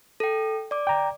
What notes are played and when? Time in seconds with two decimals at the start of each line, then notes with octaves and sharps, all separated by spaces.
0.20 A4 G5
0.71 D5 D6
0.87 G5 A#5